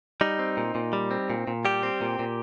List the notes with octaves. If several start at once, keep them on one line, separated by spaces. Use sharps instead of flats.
G3 D#4
C4
A#2
A#2
G3
C4
A#2
A#2
G3 G4
C4
A#2
A#2